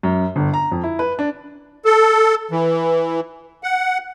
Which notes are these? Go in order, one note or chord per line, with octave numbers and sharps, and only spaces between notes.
F#2
G1
A#5
F2
E4
B4
D4
A4
E3
F#5